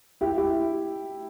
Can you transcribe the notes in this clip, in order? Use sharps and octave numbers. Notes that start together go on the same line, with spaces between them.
E4 G4
E4 G4